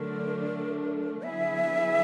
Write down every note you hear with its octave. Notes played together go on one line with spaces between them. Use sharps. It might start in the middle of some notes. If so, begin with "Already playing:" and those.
Already playing: D3 F#3 A3 D4 A#4
D3 F#3 B3 E4 G#4 E5